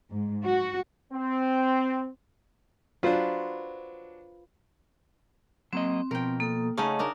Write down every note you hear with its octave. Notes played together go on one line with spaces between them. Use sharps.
G#2
F#4
C4
F#3 D4 F4 B4 C5
F#3 A#3 C4 D#5
B2 F3 A#4 G5
A#3 A4 D#6
C#3 A3 C#4 D#4 D#5 F#5 A5
D4 D#4 A#4